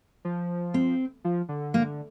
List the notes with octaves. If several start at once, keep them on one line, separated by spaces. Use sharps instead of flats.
F3
C4
F3
D3
A#3